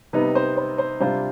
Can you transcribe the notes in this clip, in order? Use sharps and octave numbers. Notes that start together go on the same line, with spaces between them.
C3 G3 B3 D#4 B4
C5
C5
C5
C3 G3 D4 F4 C5